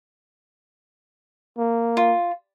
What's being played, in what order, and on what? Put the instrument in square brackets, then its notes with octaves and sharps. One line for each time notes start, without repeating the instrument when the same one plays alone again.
[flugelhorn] A#3
[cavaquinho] F4